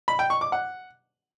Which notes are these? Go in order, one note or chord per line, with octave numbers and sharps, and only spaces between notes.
B5
G5
C#6
D6
F#5